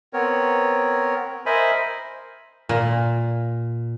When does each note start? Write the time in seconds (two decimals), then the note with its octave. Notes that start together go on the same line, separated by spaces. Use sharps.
0.13 B3 C4 A#4 C#5
1.46 A#4 C5 D#5 E5 G#5 B5
2.69 A#2